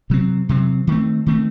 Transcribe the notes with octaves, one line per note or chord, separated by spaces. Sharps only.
C3 F#3 C4
C3 F#3 C4
D#3 A3 C4
D#3 A3 C4